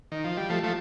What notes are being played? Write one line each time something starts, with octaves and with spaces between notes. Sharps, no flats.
D#3
F3
G3
F3 A3
F3 A3